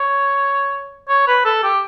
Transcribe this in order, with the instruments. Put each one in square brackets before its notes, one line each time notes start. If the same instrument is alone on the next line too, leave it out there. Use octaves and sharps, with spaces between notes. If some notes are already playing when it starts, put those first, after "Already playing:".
Already playing: [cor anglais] C#5
C#5
B4
A4
G4